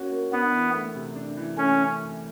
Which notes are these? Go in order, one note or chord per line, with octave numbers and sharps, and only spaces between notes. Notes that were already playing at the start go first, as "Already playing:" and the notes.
Already playing: A#3 C#4 F#4
A#3
B3 D4
E3
A3
C3
D4
E3
A3 C#4